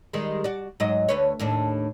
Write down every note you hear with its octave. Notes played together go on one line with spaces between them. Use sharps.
D#3 G3 G#3
F#4 D5
G#2 F#3 D#5
D2 B4 C#5
D#2 A2 D4